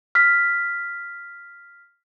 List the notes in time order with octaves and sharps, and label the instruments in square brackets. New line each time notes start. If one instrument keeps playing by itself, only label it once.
[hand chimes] F6 B6